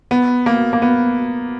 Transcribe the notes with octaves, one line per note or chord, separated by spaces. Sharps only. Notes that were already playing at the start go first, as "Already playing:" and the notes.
B3
A#3
A#3
B3